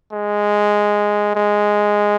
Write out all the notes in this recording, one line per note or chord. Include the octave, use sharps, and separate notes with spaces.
G#3
G#3